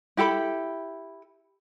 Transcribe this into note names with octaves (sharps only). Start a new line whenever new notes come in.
E4 G4 A4 B5